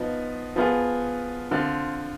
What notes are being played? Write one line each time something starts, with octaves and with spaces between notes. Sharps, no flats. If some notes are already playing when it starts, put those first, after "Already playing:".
Already playing: F3 B3 D#4
F3 B3 F4 G#4
D3 F3 C4 F4